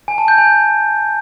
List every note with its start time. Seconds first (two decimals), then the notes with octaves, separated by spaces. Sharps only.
0.08 G#5
0.18 A5
0.28 G6
0.38 G#5